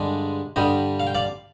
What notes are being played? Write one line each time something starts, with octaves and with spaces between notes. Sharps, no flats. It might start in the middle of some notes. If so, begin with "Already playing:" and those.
Already playing: G2 D3 G#3 D4
G2 D3 G3 D#5 G5
F5
G5
D5 F5